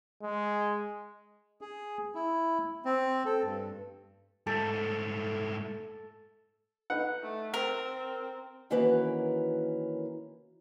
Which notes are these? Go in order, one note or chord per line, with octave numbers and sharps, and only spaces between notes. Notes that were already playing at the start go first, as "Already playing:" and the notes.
G#3
G#4
E4
C4
A4
G2
G#2 A3 A4
D#4 B4 F#5
A3
C4 A#4
D#3 E3 A#3 C#4 F#4 B4